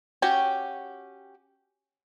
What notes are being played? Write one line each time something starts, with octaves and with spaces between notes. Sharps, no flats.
C#4 F#4 G4 G5